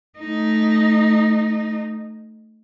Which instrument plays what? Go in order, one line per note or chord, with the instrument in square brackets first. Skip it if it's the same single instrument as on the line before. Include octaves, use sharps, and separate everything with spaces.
[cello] A3 D#4